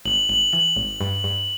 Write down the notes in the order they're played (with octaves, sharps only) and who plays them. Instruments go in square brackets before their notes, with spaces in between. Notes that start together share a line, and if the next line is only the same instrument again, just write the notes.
[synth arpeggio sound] G#1 [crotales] F#7
[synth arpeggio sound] G#1 [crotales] F#7
[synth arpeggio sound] E3 [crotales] F#7
[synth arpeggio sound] G#1
G2
G2